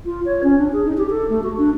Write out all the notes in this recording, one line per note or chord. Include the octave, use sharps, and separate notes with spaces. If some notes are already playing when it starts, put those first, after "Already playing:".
F4
C#5
C#4
D4
G#4
D#4
G4
A4
A3
F#4
D4